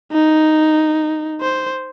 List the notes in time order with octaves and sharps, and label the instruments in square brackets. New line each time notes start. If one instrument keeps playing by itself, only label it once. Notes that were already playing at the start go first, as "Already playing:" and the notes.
[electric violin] D#4
C5